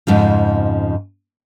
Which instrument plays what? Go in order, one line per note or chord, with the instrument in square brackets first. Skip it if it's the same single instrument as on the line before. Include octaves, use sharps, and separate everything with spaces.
[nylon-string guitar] F2 G#2 C#3 F3